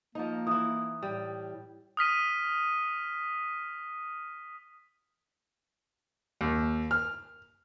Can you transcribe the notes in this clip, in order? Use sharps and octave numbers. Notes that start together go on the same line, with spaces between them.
F3 A#3 D#4
E3 E4 D#6
A2 G3
D#6 F6 B6 D#7
D#2
F6